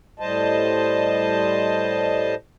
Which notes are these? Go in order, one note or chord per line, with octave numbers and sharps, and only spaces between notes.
A2 G3 C5 D#5 A5